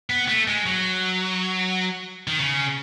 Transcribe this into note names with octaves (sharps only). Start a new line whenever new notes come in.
B3
A3
G#3
F#3
D#3
C#3